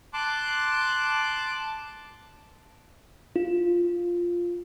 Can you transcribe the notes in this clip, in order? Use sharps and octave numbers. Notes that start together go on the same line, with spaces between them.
A5 C6 D6 F#6
F4